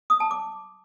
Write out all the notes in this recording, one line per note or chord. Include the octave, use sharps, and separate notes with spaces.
D#6
A5
D6